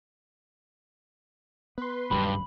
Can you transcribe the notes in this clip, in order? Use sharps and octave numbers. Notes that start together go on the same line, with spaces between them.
B3 B4 C6
D#1 C#2 G2 F#3 B5